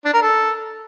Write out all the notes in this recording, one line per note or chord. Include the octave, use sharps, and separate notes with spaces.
D4
A#4
A4